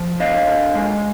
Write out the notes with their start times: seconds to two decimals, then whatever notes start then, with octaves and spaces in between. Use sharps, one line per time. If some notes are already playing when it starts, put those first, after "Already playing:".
Already playing: F3
0.20 D3 D#5 F5
0.47 D3
0.75 G#3